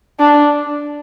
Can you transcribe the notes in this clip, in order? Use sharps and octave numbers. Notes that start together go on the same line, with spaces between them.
D4